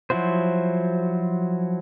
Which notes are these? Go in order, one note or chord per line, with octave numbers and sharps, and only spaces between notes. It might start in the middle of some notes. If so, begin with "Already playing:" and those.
F3 F#3 E4 F#4 C5